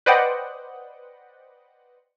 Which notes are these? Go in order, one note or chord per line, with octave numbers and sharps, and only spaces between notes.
B4 C5 D5 D#5 F#5 G5